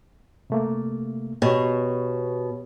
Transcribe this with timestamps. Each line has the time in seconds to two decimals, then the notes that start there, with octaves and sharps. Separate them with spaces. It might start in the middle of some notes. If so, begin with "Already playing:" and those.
0.50 C3 A3 A#3
1.42 B2 G4 C#5